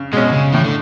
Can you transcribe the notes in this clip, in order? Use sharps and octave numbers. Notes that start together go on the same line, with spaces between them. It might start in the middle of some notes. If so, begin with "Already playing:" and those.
Already playing: C#3
B2 G#3 C#4
C#3
A2 E3
D3